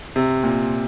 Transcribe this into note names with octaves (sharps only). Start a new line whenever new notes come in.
C3
A#2